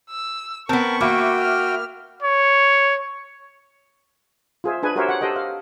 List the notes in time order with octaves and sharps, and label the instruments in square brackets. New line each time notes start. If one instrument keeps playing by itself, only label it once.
[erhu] E6
[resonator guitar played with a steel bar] B3 C4 [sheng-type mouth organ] A#4 [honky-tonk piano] A5 [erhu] C#6
[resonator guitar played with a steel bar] A#3 [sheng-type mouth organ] F#4 G5 [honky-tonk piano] E5 B5 D6
[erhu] F6
[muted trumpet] C#5
[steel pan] F4 G#4 C5 E5
D4 G#4 B4 G#5
F#4 G4 A#4 C5 C#5 E5
C#5 F#5
G4 A4 C5 D#5 G5
F5